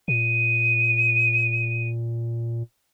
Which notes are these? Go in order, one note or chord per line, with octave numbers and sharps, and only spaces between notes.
A#2 D#7